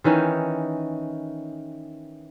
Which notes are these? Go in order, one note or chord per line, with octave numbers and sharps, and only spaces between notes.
D#3 E3 C#4 D#4